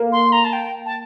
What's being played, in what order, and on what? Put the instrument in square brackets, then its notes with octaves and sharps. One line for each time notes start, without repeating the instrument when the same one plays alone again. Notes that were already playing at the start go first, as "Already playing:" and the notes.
Already playing: [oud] A#3
[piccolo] C6
A#5
A5
G5
A5